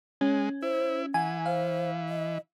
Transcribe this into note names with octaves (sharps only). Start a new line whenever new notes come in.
G#3 C#4
E4 C5
E3 F#5 G#5
C5 F5
D#5